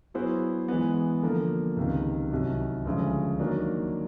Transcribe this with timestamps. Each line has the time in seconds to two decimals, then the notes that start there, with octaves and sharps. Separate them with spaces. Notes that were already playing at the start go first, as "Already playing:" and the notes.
0.14 F#3 B3 E4 G#4 C5
0.68 E3 G#3 B3
1.23 D3 F3 A#3
1.77 C#2 C3 D#3
2.31 C2 C3 D#3 F#3
2.85 D2 C#3 F3 G#3
3.39 D#3 F#3 A#3 D4